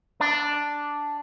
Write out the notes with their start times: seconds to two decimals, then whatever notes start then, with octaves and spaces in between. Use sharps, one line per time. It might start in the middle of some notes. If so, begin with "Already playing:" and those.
0.20 D4